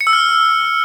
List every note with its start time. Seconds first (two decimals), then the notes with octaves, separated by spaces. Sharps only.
0.01 C#7
0.07 E6
0.13 F6